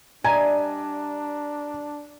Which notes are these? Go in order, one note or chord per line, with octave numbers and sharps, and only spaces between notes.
G3 D4 D#5 E5 G#5 A#5